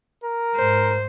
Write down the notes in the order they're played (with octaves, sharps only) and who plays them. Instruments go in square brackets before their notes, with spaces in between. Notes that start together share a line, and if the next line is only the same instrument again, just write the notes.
[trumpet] A#4
[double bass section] G#2 [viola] C5